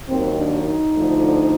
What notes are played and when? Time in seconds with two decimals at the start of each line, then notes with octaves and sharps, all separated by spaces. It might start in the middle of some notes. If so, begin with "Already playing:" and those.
0.08 D#2 D#3 F#3 C4
0.37 D4
0.66 D#4
0.94 D2 D3 F3